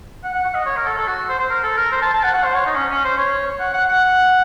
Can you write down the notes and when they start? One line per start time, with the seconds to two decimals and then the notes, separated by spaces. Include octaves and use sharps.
0.24 F#5
0.34 F#5
0.44 F#5
0.55 D#5
0.66 C#5
0.76 A#4
0.86 A4
0.98 A4
1.07 F#4
1.29 C5
1.39 C5
1.50 A#4
1.63 A4
1.77 A#4
1.92 C5
2.02 A5
2.14 A5
2.23 F#5
2.34 F#5
2.44 C5
2.55 C#5
2.66 D#4
2.76 C#4
2.91 C#4
3.05 C5
3.18 C#5
3.60 F#5
3.74 F#5
3.89 F#5